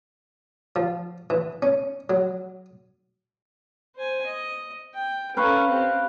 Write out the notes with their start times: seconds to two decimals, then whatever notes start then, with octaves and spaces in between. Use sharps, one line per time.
0.76 F3
1.30 E3
1.62 C#4
2.10 F#3
3.96 C5 G#5
4.26 D#5
4.94 G5
5.37 C#4 A4 B4 F5 C#6
5.68 C4 G4